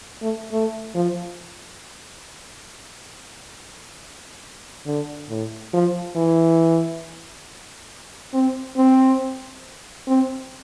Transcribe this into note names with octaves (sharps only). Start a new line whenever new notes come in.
A3
A3
F3
D3
A2
F3
E3
C4
C4
C4